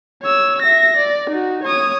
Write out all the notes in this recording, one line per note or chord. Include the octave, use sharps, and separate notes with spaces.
C#5 E6
E5 A#6
D5
D#4 F#4
C#5 D#6